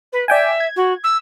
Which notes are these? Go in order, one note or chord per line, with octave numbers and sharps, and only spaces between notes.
B4
D5 E5 G5 G#5
G#6
F#4
E6